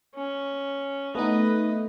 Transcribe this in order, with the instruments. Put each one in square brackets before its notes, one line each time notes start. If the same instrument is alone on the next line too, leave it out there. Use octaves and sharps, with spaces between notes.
[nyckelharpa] C#4
[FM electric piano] A3 B3 D#4 [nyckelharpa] B4 D#5